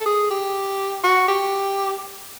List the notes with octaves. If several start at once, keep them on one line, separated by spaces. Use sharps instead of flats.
A4
G#4
G4
F#4
G4